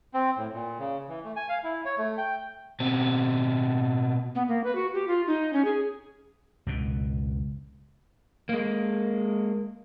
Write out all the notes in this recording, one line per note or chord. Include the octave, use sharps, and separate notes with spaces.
C4
A2
A#2
C#3
E3
A3
G#5
F5
E4
C#5
A3
G5
B2 C4
B3
A#3
B4
F#4
G4
F4
D#4
C#4
G#4
C#2 F#2 B2
G#3 A#3